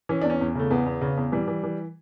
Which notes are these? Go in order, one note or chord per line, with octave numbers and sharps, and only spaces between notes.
E3 C#4
E2 D4
C#4
E2
C#3 A3
E2 B3
E2
C#3
E2
E3 G3
E3
E3